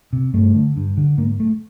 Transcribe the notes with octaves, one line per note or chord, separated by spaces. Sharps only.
C3
G2 A3
D3
G2
D3
G#2 A#3
A3